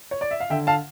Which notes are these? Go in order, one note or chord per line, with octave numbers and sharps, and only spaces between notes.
C#5
D5
E5
F5
D3 E5 G5
F5 A5